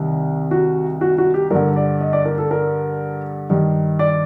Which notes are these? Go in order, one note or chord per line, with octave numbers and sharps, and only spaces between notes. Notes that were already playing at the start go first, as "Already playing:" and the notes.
Already playing: C2 C3 D#3
F#4
F#4
F#4
G4
G2 D3 A#4
D5
D#5
D5
A#4
A4
A#4
G2 D#3
D5